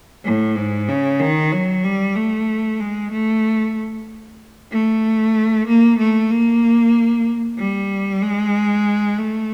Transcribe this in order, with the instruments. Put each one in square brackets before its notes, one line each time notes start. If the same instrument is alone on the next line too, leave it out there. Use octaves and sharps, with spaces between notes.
[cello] A2
G#2
C#3
D#3
F#3
G3
A3
G#3
A3
A3
A#3
A3
A#3
G3
G#3
A3